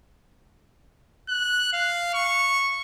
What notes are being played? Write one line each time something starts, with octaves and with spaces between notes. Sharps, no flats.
F#6
F5
C#6